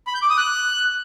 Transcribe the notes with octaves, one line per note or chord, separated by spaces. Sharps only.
B5
G6
D6
D#6
F#6